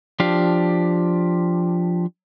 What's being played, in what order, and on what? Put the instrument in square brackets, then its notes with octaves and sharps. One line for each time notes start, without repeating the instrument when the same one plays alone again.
[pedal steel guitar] F3 D4 G4 F5